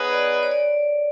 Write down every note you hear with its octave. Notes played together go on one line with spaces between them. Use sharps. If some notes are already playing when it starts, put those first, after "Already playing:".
Already playing: B3 D#4 G#4 B4 C#5
D5
C#5
D5